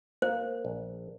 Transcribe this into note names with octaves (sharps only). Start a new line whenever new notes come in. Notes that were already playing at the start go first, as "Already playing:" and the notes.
A#3 C5
A#1